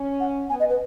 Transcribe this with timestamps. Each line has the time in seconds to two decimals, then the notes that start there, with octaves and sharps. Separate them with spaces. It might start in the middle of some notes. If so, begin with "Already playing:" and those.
Already playing: C#4
0.20 F#5
0.49 B3 G#5
0.59 D#5
0.69 B4